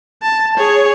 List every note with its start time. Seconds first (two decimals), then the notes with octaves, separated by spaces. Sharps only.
0.22 A5
0.57 G#4 C#5